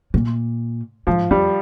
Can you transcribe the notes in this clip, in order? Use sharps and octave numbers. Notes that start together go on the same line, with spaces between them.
A#2
G#2 F3
F2 G3